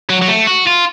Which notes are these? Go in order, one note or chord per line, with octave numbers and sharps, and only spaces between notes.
F#3
F#3
A3
F#4
F4